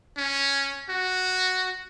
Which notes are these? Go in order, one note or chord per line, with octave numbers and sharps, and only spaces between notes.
C#4
F#4